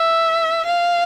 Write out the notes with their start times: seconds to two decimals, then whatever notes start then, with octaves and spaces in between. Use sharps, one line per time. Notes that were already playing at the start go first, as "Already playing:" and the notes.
Already playing: E5
0.65 F5